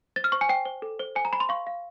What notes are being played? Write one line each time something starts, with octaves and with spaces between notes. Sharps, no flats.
C5 A6
F6
C5 C#6
G#5
C5 G5
C5
A4
C5
C5 G#5
A#5
C5 B5
C6
F5 C#6
F5